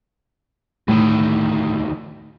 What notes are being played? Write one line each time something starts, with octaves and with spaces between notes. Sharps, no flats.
D2 A2 D#3